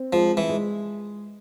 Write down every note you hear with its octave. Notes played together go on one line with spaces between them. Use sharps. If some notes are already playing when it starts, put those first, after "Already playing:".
Already playing: C4
F3 G#3
E3
G#3